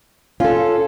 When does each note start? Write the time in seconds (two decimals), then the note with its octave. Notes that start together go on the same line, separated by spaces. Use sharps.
0.40 C#4 F4 A4